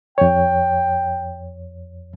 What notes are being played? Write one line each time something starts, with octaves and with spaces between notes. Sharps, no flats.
F2 C#5 G5